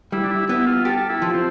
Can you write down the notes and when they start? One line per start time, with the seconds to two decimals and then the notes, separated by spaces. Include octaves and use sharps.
0.12 G3 E4
0.24 D4
0.31 E4
0.49 B3 E4
0.67 F4
0.85 G4 A4
1.10 E4
1.22 F3
1.34 C4